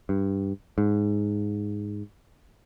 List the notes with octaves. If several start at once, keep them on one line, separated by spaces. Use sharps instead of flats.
G2
G#2